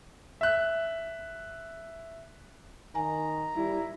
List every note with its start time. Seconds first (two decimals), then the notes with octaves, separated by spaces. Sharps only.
0.41 E5 F#6
2.95 D#3 G#5 A#5
3.55 G3 E4